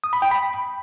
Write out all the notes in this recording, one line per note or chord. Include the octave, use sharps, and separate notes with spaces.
D#6
B5
G5
B5